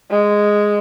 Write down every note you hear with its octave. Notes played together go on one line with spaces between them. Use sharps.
G#3